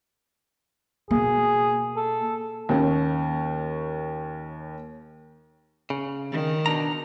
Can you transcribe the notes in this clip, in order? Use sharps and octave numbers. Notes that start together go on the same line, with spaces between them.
B2 A#3 G#4
A4
D#2 C#4
C#3
D#3
B2 D4 A#5